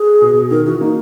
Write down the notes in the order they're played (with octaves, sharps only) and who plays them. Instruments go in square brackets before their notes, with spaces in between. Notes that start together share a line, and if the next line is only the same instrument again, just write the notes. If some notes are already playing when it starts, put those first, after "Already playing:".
Already playing: [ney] G#4
[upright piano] B2
[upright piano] D#3 [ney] A#4
[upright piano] E3 [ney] F#4
[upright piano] A#3 [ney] D#4